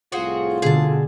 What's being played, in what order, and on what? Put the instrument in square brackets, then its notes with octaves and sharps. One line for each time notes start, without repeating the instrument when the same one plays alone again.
[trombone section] C2 A2 F4 [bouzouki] C4 F#4 G#4
[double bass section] B2 D3 [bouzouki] G#4 A5